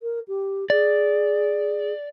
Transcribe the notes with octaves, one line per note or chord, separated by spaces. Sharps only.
A#4
G4
G#4 D5